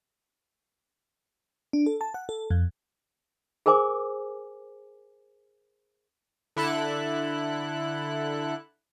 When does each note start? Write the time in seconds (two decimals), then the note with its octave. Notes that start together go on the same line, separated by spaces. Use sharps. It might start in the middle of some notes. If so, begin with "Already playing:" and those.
1.73 D4
1.86 A4
2.01 A5
2.14 F#5
2.29 A4
2.50 F2
3.66 G#4 A#4 C5 G#5 D6
6.56 D3 E4 A4 F#6